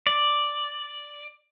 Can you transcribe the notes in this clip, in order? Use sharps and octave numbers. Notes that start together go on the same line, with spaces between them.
D5